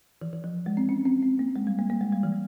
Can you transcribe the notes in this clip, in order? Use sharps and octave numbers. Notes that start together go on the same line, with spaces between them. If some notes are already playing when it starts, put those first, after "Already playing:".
E3
E3
F3
G#3
C4
C#4
C4
C4
A#3
G#3
G3
A#3
A#3
G#3
G3
E3